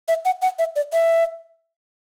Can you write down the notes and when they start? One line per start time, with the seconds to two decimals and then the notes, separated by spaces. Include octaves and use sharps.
0.08 E5
0.25 F#5
0.42 F#5
0.59 E5
0.76 D5
0.93 E5